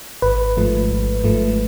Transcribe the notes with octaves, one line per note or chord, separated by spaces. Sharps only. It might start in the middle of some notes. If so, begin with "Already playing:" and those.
G#1 B4
G#2 F3 A3
G#1
G#2 F3 A3